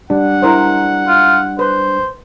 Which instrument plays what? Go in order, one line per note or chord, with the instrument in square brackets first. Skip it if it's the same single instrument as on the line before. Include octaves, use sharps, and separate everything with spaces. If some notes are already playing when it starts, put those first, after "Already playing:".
[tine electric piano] G3 D4 [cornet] F#5
[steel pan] E4 A#4 C5
[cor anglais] F4
[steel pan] B4 [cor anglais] C5